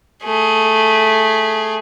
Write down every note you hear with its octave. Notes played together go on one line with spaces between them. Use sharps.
A3 G#4